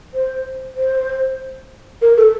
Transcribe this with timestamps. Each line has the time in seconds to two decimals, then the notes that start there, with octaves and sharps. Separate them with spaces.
0.14 C5
0.76 C5
2.02 A#4
2.17 A4